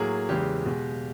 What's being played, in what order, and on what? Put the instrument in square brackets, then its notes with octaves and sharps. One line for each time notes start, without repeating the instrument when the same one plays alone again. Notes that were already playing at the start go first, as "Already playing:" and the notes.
Already playing: [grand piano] A2 F#3 A#3 G#4
E2 C#3 E3 G#3 G4
B2 G#3